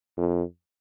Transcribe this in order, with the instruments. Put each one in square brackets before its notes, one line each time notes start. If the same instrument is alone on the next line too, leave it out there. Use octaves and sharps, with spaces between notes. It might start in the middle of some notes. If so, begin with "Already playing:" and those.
[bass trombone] F2